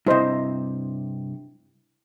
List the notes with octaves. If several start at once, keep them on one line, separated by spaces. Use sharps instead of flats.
G2 C3 E4 C5 D#5